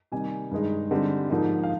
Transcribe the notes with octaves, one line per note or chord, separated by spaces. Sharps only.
C3 D#3 G3 A#3 D#4 G#5
G2 D#3 G#3 D#4
D3 G3 C4 D#4
G#2 F3 A#3 D#4
F5